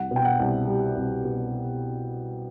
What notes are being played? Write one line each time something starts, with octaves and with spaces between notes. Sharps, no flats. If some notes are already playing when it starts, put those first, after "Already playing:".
Already playing: C2 F#5
B2
G5
F#5
C2
G3
C2
B2